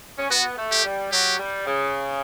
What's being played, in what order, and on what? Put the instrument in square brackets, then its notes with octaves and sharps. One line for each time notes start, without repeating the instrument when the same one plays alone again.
[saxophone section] C#4
[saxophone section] B3 [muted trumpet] F#4
[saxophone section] A3
[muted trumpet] G4
[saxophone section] G3
[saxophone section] F#3 [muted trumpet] G4
[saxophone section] G3
C#3